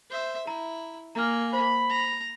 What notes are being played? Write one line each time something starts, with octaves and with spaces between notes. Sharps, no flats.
C5 E5
E4 A#5
A#3 G#5 A#5 F6
C5 B5
A#5